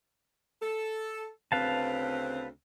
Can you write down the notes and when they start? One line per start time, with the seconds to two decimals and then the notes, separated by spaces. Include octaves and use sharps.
0.61 A4
1.52 D2 C#3 C4 B4 F5 A5